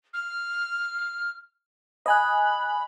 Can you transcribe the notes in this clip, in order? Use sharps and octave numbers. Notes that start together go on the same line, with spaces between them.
F6
D#5 G#5 B5 F#6